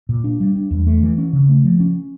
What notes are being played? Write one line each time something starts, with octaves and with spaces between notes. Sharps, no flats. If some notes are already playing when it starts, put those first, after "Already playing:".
A#2
D4
G3
D4
E2
A3
E3
C#4
C#3
A3
F3
C#4